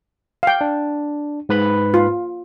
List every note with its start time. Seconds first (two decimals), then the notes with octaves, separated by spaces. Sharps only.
0.43 F5 G5
0.61 D4
1.49 G#2 B4 B5
1.94 F4